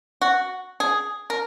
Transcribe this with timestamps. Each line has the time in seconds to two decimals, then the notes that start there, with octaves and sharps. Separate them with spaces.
0.21 F#4
0.80 G#4
1.30 A#4